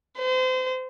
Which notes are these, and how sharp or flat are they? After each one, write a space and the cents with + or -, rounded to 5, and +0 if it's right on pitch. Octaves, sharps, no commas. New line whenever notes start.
C5 -30